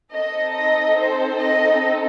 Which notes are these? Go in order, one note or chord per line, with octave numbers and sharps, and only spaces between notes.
C4 D#4 A4 D#5
D#5
C5
D#5